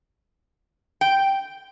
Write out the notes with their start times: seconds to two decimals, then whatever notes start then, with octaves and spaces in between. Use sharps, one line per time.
1.01 G5